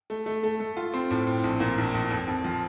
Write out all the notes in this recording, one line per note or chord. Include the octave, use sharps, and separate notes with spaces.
A3
A3
A3
A3
F4
C4
A2
C4
A#1
A#2
A#1
A#1
F2
F2
F3